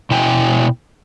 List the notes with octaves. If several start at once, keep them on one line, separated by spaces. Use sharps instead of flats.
B2 E4 G5 G#5